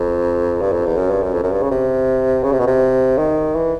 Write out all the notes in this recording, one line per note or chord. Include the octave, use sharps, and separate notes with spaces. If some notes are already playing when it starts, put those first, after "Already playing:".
Already playing: F2
G2
F2
E2
F#2
G2
F#2
F2
F#2
G2
C#3
C3
C#3
C3
B2
C3
D#3
E3